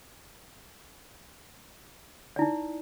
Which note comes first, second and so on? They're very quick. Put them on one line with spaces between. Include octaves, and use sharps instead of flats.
D5 E4 D#4